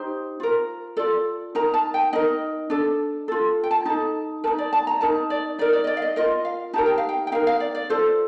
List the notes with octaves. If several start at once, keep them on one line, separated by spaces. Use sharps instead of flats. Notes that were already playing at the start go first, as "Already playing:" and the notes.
Already playing: D#4 G4 C5
F4 A#4
F4 A4 D5
D#4 A#4 A#5
A5
G5
D#4 A#4 D#5
D4 A4
F4 A4
G5
A5
D#4 A4 A5
D#4 A#4 A5
D5
A5
A#5
D#4 A#4 A5
D5
D#4 A#4 D5
D5
D#5
D5
F5
D#5
F4 A#4 D#5
F5
D#4 G4 A#4 A5
G5
F5
G5
G5
D#4 A#4 F5
F5
D5
D5
F4 A4 C5